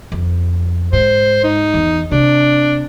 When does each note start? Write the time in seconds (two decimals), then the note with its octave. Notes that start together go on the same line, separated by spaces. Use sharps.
0.12 F2
0.93 G#2 C5
1.44 D#4
1.74 E2
2.11 C3 D4